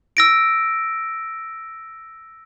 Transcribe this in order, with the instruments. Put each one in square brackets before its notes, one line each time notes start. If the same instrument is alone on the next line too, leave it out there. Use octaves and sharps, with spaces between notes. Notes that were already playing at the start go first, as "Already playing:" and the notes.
[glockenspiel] E6 A#6 D7